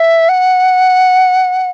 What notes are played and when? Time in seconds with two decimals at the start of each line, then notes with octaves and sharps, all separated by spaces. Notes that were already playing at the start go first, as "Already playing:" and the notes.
Already playing: E5
0.29 F#5